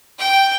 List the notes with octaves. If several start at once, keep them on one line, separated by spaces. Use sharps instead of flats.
G5